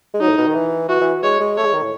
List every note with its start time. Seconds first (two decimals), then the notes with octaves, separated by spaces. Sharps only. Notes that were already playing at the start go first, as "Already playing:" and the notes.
0.14 G#3
0.21 F#3 D#4
0.29 A2
0.38 B2
0.47 D#3
0.55 E3
0.89 E3 F#4
1.01 E3
1.23 G#3 C#5
1.40 G#3
1.57 A3 C#5
1.66 G#3
1.74 D#3
1.82 A2